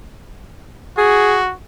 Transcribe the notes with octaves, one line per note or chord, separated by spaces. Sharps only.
F#4 G#4